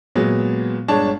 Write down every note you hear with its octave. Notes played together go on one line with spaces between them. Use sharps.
A#2 F#3 G#3 B3
G1 G#3 D4 C#5 A5